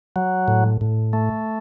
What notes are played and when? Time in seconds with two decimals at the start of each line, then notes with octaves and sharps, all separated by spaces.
0.16 F#3
0.48 A2
0.81 A2
1.13 A3